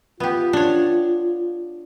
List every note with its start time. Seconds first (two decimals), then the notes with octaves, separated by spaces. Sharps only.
0.20 B3 F4 G4
0.53 D4 C#5